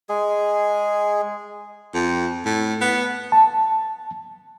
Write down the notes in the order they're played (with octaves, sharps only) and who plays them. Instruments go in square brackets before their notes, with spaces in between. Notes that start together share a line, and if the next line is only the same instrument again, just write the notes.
[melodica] G#3 G#4
[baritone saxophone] F2
A2
B3
[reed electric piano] A5